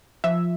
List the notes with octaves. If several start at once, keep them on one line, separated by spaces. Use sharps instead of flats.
F3 E5